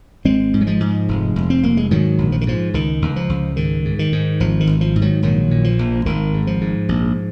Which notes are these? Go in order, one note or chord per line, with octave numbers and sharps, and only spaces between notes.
G#1 G#3 C4
G#2
F#3
F3 G#3
G#2
F1
F1
C4
F1 A#3
G#3
G#2 D#3 F#3
A#1
F3
D#3
G#2 F3
C#2 D#3
C#2
F3
C#2
G#2 D#3
G#2
D#3
G#2
G#1 F3
D#3
G#1
F3
G#2
D#3 F#3
A#1 D#3 F#3
A#2
F3
A#1
G#1 D#3
G#2
F3
G#2
A#1